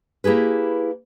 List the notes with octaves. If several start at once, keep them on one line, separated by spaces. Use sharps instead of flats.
A#3 E4 G4 G#4 B4